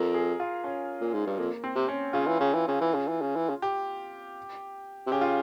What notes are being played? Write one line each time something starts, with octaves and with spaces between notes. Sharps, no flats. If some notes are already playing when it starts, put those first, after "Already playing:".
Already playing: F2 A#4
G#4
F4
C#4
A#2
G#2
G2
F2 A#3
C4
C3
C#4
C#3 F4
E3
C#3
E3
C#3
E3
C#3
E3
C#3
E3
C#3
G4
C3
C#3 G4
F4